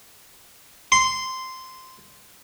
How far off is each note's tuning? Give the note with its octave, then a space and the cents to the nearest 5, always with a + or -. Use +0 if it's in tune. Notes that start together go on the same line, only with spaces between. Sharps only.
C6 -10